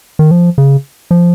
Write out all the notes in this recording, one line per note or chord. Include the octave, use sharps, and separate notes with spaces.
D#3
F3
C#3
F3